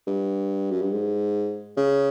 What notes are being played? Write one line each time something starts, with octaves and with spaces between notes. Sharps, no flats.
G2
F#2
G2
G#2
C#3